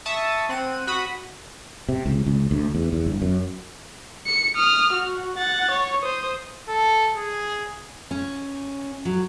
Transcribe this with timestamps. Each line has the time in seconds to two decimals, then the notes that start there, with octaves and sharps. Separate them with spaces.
0.06 E5 A5 C#6 D#6
0.49 C4 F#5 D#7
0.87 F#4 B5 D#6
1.89 C3
2.06 C#2
2.26 C#2
2.51 D2
2.75 E2
2.93 E2
3.06 G1
3.22 F#2
4.26 C#7
4.56 D#6 F6
4.93 F#4
5.38 F#5 A6
5.71 C#5
6.03 C5 D#6
6.69 A4
7.16 G#4
8.11 C#4
9.05 F#3